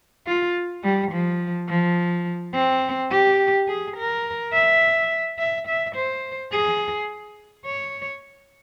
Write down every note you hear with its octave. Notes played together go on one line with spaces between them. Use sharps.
F4
G3
F3
F3
C4
G4
G#4
A#4
E5
E5
E5
C5
G#4
C#5